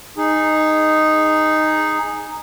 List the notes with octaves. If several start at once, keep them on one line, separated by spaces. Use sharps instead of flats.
D#4 G#4